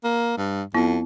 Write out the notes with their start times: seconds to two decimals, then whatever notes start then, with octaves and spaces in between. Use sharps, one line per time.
0.04 A#3
0.38 G2
0.75 F2 B3 E4